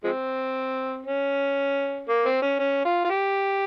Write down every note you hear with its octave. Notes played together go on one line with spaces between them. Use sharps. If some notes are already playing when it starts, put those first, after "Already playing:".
F3 G#3 C4
C#4
A#3
C4
C#4
C#4
F4
F4
G4